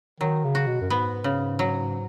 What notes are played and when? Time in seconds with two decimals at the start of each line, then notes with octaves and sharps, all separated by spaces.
0.20 D#3 F#3
0.44 C#3
0.55 F#4
0.67 B2
0.81 F#2
0.90 G#2 B3
1.24 C#3
1.59 F#3